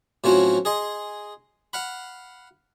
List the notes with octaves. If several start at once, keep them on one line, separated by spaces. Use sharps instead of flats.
A2 F3 F#3 C4 C#4 F#4
G#4 D#5 C6
F5 F#5 B5